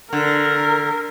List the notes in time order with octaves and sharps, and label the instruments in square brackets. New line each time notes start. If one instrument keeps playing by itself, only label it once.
[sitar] D3 [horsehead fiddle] A#4